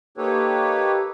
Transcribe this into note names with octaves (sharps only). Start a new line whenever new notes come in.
A#3 D#4 G4 A4 B4 C#5